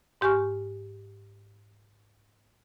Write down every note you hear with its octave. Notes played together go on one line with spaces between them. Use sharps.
G#2 G4 G#5 C#6 F6